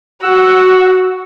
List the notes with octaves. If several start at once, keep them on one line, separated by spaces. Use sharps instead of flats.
F#4 F#5 E6